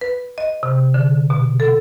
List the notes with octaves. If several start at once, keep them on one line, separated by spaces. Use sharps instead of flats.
B4
D#5
C3
D3
B2
A4